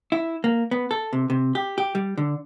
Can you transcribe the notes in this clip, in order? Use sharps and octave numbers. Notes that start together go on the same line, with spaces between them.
E4
A#3
B3
A4
C3
C3
G4
G4
G3
D3